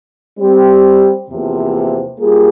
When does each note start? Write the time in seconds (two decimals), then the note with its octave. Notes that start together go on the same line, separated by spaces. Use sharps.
0.38 G3 C4 G4
1.28 E2 C3 F3 A#3
2.19 G3 A#3 F4 G#4